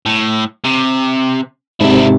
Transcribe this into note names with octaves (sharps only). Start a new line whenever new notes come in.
A2
C3
G#2 C3 D4 E4